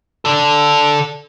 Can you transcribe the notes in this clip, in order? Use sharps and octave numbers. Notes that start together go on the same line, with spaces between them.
A4 D5